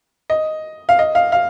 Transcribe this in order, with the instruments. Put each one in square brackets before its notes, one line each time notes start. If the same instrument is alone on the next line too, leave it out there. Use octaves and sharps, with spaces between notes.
[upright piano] D#5
F5
D#5
F5
F5